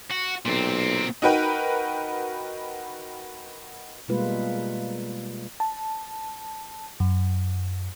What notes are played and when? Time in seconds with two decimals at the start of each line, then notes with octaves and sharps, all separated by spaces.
0.11 F#4
0.46 B1 A#2 C4
1.22 D#4 F#4 A#4 B4 G5
4.08 B2 G3 G#3 A#3 F4 B4
5.60 A5
7.00 F#2